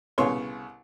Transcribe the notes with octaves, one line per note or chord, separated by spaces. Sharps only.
C2 C#3 B3 C#5 C6